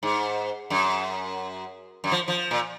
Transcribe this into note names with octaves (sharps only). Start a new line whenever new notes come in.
G#2
F#2
F#2
F3
F3
A#2